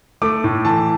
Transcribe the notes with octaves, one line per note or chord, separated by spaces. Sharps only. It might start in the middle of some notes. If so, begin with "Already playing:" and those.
A3 D6
A2
E3 A5